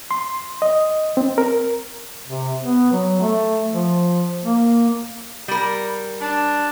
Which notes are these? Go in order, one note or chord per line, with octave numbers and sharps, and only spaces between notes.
C6
D#5
C4
A#4
C3
B3
F#3
A3
F3
A#3
G3 A#4
D4